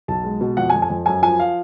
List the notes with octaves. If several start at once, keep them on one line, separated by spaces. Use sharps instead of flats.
B1 A5
G#3
B2
F2 F#5
G#5
F2
G#5
F2
F#2 G#5
F3 G#5
F5